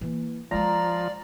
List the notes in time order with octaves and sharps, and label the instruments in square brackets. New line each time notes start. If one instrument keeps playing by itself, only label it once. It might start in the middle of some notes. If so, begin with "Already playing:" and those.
[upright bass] E3 A#3
[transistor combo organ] F3 [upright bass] G#3 F4 [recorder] D5 [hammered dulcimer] A#5